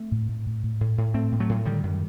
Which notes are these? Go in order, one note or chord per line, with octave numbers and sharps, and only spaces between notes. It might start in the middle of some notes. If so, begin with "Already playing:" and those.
Already playing: A3 C4
A2
A2
A2
A2
A2
A2
A2 A3 C4
A2
F#3 A3
A2
D3 D#3 G3
F#2